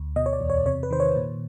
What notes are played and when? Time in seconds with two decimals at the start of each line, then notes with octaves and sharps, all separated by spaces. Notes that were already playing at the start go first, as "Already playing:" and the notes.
Already playing: D2
0.16 B2 D#5
0.26 C#5
0.33 D5
0.41 E2
0.50 C#5
0.66 C3 C#5
0.83 B4
0.91 D#3 C5
1.00 C#5
1.16 A#2